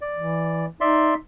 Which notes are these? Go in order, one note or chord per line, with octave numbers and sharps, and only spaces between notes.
D5
E3
D#4 D5 E5 C6